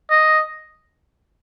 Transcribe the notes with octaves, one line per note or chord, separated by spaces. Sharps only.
D#5